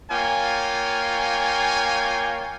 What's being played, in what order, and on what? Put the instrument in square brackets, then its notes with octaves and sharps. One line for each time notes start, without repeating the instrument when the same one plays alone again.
[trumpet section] A#3 F4 C#5 G5 G#5